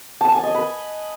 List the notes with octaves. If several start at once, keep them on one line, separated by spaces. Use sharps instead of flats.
A5
G#5
D#5
B4